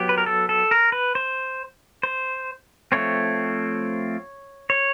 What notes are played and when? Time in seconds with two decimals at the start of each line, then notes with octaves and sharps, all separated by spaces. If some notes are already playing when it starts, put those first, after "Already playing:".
Already playing: F#3 B3 G4
0.09 B4
0.18 A#4
0.26 A4
0.49 A4
0.71 A#4
0.92 B4
1.15 C5
2.03 C5
2.92 F3 A3 C4 C#5
4.70 C#5